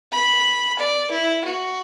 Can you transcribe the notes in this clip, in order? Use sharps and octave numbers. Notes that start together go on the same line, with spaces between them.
B5
D5
E4
F#4